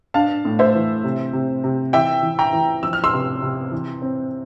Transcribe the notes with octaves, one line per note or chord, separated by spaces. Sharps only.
D4 F5 A5
A2
C5 E5
E3
C3
C3
C3
E3 E5 G5
E3
G5 A#5
E3
F3 E6
F6
C6 E6
C3
C3
E3
C4